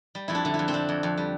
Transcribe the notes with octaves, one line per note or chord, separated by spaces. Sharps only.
G3
F2 E4
D4
D3
E4
F2
C4
F2 D4
F2
F2
G3